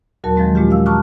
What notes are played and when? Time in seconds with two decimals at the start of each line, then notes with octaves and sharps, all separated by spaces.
0.24 D#2 A#2 F#3 F#4 A#4 A5
0.36 D#3 F3 F#3 G#3 C4
0.55 A#2 G#3 C#4 F4 G4
0.71 F5 E6
0.86 A5 A#5 C#6 D6 F6 F#6